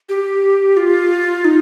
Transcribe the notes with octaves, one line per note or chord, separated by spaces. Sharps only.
G4
F4
D#4